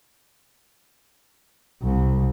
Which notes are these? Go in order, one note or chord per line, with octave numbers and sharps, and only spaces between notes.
C2